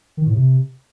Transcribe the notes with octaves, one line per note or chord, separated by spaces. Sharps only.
D#3
A2
C3